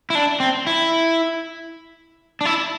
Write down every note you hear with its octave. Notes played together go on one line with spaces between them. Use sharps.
E4
D4
C4
E4
D4
E4